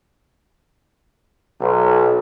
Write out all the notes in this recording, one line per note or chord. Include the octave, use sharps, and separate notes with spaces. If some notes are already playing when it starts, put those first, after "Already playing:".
B1